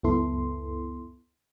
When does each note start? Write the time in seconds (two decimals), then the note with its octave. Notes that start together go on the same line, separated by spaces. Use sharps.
0.03 C#2 F#2 B3 E4 A4 C6